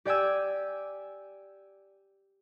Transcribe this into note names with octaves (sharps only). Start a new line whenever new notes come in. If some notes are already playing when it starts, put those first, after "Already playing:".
G4 D5 G5 G#5 E6